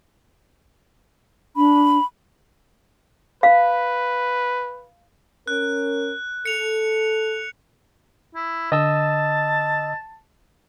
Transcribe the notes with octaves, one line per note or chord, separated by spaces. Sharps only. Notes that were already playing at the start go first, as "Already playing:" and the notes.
D4 B5
B4 F5
C#4 A#4 F#6
A4 C#7 F7
E4
D3 D#5 A5 E6